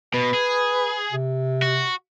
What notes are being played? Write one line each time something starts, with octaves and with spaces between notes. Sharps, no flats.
B2 B4
G#4
C3
F#4